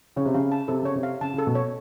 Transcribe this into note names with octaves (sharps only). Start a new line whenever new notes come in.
C#3 C#5
C3
C#3 F5
A5
C3 A4
C#3 C#5
C3
F5
C#3 A5
C#3
A4
B2
C#5